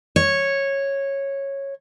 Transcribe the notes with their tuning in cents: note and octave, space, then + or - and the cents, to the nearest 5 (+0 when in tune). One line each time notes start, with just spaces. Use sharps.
C#5 -10